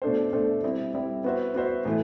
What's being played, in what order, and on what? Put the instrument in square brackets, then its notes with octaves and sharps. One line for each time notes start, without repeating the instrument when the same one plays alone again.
[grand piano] B2 A3 D4 A4 C5
B2 A3 D4 A4 C5
G3 C4 E4
G3 C4 E4
B3 F#4 C5 E5
B3 F#4 C5 E5
A2 E3 A3 E4